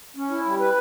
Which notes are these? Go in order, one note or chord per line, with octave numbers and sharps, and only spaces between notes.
C#4
E4
G3
B4